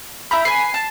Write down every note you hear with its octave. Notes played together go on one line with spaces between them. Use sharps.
E4 A#5 B5 G6
B4 G#5 C7
A5